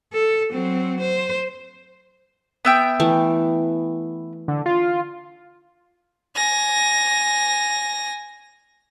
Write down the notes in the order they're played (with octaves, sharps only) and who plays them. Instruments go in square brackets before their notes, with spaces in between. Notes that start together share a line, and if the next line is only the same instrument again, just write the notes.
[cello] A4
F#3 C4
C5
[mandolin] B3 E5 G5
[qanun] E3 A3
[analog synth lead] D3
F4
[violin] G#5 A#6